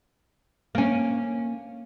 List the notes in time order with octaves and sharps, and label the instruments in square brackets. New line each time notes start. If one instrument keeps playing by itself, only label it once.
[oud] A#3 C#4